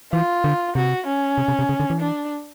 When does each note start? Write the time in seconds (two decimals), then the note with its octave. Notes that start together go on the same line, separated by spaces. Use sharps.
0.13 E3 F4
0.44 D3
0.75 C3 F#4
1.07 C#4
1.38 C3
1.48 C3
1.59 C3
1.69 C#3
1.80 D3
1.90 E3
2.00 D4